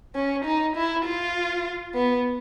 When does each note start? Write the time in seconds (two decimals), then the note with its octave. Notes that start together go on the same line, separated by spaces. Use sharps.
0.15 C#4
0.45 D#4
0.76 E4
1.05 F4
1.94 B3